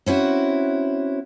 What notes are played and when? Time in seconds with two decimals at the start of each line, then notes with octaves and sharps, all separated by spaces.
0.06 C4 C#4 E4 F#4